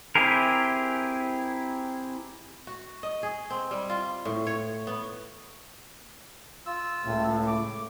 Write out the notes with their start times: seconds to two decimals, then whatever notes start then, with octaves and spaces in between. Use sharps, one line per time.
0.15 C4 E4 G4 G#4 A#4
2.67 F#4
3.03 D#5
3.23 G#4
3.50 C4
3.71 G3
3.90 F4
4.25 A2
4.47 C#5
4.87 B3
6.66 F4 E6
7.05 C#2 A2
7.47 D6